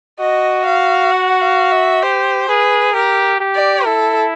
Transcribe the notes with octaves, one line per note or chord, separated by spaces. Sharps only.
F#4 D#5
F5
F#5
F5
E5
G4 C5
G#4 B4
G4 A#4
G4
D5
E4 A4